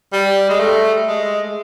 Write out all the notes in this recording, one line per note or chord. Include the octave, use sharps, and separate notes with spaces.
G3
G#3
A3
G#3